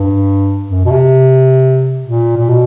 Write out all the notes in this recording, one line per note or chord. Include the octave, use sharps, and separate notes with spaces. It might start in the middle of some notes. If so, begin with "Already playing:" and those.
Already playing: G2
F#2
B2
C3
A#2
A#2
B2